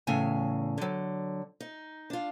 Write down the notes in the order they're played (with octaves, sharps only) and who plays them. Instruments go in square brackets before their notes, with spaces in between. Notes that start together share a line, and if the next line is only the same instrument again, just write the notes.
[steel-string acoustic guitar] E2 A2 C#3 G#5
D3 F#3
D#4
D4 F4